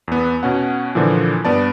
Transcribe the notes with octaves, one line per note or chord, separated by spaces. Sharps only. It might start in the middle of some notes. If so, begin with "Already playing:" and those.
E2 B3
B2 C#4 F#5
A#2 D3 E3 F3
G2 B3 D5 A5